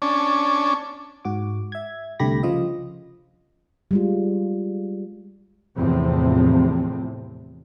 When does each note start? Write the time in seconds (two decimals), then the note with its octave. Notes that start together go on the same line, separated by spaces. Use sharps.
0.02 C#4 D4
1.25 G#2 F#4 D6
1.72 E5 G#6
2.19 C2 D3 A3 G4 B5 A#6
2.43 C#3 F3 F4 D#5
3.91 G3 G#3 F4
5.76 E2 A2 C3 F3 C4